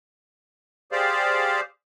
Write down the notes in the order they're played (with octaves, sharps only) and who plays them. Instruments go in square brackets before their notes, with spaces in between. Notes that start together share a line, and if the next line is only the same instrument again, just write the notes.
[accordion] G4 G#4 C5 D5 F5